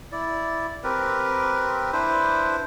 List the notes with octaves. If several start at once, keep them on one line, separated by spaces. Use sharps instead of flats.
E4 D5
C4 G4 A#4 B4
D4 E4 B4 C5